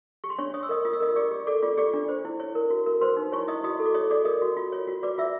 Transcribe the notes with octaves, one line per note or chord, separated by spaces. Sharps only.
G4 C#6
C6
D4 C#5 C#6
C#5 D#6
E6
A#4 D#5 D#6
F4 D#6
E6
A#4 D#5 D#6
G4 D5 D6
G4
A4 D5 D6
F4 D5 D6
G4 D5 D6
D4
C5
E4
C#5
A#4
F#4
A#4
B4 C5 C6
D#4
E4 C#5 C#6
E4 D#5 D#6
F#4 D#5 D#6
A4
D6
C#5 D#5 D#6
G#4 D5 D6
A#4 D#5 D#6
F#4
F4
C#5
F#4
B4 D5 D6
F4 E5 E6